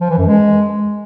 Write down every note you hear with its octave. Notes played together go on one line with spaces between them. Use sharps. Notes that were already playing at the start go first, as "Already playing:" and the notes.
F3
E3
F#2
G#3